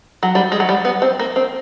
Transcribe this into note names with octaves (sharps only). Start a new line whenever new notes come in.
F#3
G3
G#3
F#3
G3
B3
C4
A#3
C4